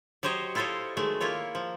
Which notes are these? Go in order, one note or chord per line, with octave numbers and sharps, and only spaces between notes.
F#3 G4 C5 C#5 D#5
E4 F4 A4 C5 C#5 D#5
D#3 F#3 G#3 A3
A#3 E4 F4 C#5
F3